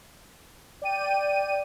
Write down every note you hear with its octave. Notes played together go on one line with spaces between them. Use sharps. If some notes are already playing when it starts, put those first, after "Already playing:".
D5 G5 D#7